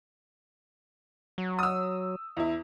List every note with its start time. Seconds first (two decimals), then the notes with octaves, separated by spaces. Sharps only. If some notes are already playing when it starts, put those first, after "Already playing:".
1.38 F#3
1.59 D#6 E6
2.37 E2 E4